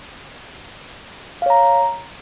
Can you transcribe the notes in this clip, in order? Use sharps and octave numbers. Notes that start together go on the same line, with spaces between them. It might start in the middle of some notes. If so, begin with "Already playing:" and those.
C#5 F5 A#5